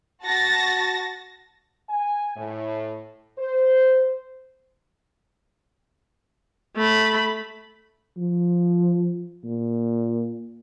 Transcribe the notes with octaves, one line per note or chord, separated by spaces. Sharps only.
F#4 A5 A6 A#6
G#5
A2
C5
A3 B5
F3
A#2